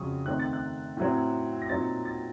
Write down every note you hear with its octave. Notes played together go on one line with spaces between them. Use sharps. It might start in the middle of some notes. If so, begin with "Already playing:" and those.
Already playing: F2 C#3 F#3 C4 C#6 D#6
D#3 A3 C4 D#4 F#6
A6
F#6
A2 F#3 C4
A#6
A#2 F#3 C4 D#4 A6
A6